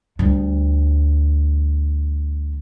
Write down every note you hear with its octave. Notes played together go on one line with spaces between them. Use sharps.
D2 G3